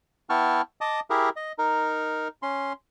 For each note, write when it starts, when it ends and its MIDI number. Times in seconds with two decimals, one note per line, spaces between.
0.30 0.62 59
0.30 0.62 64
0.30 0.62 79
0.30 0.62 81
0.30 0.62 85
0.30 0.62 89
0.81 1.00 75
0.81 1.00 81
0.81 1.00 86
0.81 1.00 87
1.10 1.29 64
1.10 1.29 67
1.10 1.29 68
1.10 1.29 70
1.10 1.29 76
1.36 1.52 75
1.59 2.28 63
1.59 2.28 70
2.42 2.73 61
2.42 2.73 84